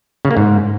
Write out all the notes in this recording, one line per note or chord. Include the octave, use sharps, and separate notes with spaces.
C#3
A#3
G#2